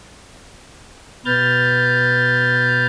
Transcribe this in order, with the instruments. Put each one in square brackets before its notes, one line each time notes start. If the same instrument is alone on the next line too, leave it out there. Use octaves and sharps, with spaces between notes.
[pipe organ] B2 B4 F6 G6 A6